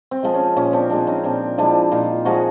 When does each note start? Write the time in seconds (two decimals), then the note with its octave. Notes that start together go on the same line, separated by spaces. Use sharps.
0.11 C4
0.23 F3 G#3
0.34 C#4
0.57 A#2 C#4
0.73 C4 D4
0.90 F3 G#3 C4 D4
1.07 C#4 D#4
1.24 A#2 C4 D4
1.58 F3 G#3 D4 E4
1.91 A#2 D#4 F4
2.25 F3 G#3 F#4 G#4